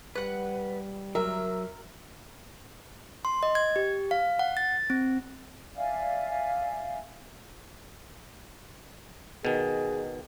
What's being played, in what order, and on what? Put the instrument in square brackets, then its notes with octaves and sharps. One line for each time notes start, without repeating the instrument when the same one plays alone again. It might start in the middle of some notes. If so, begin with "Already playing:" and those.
[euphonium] G3 [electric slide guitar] B4 [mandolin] F#5 F#6
[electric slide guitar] F#3 [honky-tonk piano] A#4 [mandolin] E5
[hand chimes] C6
D#5
G#6
G4
F5
F#5
A6
C4
[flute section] D5 E5 F5 G#5
[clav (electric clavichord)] B2 D#3 [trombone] G#4